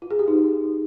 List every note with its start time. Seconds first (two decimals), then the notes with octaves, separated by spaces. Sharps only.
0.02 F4
0.11 G#4
0.19 G4
0.28 D#4